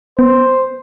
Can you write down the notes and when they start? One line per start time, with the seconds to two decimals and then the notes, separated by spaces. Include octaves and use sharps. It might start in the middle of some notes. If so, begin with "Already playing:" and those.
0.19 B3 C5